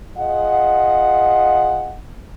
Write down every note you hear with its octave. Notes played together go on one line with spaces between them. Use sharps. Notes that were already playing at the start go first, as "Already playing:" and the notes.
F4 G#4 D#5 F#5